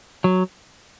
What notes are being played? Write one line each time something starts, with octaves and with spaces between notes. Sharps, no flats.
F#3